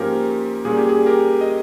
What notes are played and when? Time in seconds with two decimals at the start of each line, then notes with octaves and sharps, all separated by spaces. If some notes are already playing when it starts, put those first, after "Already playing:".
Already playing: G#2 F3 A#3 C#4 G4 A#4
0.65 A#2 G3 A#3 C#4 G#4
0.77 G4
0.89 G#4
1.06 G4 A#4
1.41 D#5